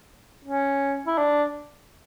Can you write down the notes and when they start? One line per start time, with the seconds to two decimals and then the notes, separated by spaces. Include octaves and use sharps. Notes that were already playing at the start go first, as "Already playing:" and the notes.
0.45 C#4
1.07 E4
1.18 D4